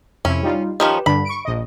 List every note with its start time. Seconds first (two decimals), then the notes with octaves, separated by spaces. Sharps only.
0.25 F2 C3 C#4 E4
0.43 G3 D#4 F4
0.80 D#3 F3 C#4 G4 B4
1.06 G2 D3 D4 B5
1.25 C#6 D7
1.45 A#1 D#5